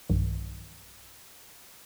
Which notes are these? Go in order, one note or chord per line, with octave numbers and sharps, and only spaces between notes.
B1 G2 D#3